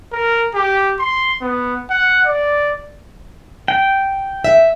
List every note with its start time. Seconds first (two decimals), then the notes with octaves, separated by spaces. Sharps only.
0.12 A#4
0.54 G4
0.99 C6
1.41 B3
1.90 F#5
2.25 D5
3.68 G5
4.44 E5